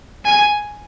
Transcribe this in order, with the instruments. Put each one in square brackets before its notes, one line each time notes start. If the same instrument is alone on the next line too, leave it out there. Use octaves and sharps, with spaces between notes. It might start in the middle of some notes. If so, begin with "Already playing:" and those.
[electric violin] G#5